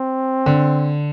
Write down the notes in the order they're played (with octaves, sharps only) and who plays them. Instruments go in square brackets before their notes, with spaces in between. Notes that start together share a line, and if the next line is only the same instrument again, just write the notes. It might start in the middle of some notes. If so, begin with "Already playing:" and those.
Already playing: [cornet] C4
[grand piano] D3